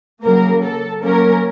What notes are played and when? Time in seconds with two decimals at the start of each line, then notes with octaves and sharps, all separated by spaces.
0.24 C#3 F#3 A#3 A#4
0.63 A4
1.03 F#3 A#3 C#4 A#4